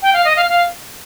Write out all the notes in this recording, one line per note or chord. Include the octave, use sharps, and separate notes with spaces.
G5
F5
D#5
F5
F5